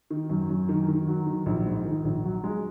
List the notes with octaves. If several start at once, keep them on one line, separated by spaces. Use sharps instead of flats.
D#3
F#2
F#2
D#3
D#3
F#3
D#3
A#1
G#2
D#3
A#1
F#3
G#3